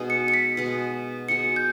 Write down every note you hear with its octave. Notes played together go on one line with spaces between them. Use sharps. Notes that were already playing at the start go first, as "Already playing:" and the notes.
Already playing: B2 G#3 D#4
C#7
C#7
B6
B2 G#3 D#4
B2 G#3 D#4 C#7
G6